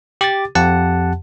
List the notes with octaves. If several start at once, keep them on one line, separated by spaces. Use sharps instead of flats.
G4 D6 A6
F2 G4 F#5 A5